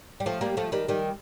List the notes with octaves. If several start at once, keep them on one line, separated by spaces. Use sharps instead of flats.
G3
F3 A3
G3 A#3
F3 A3
D#3 G3
D#3 G3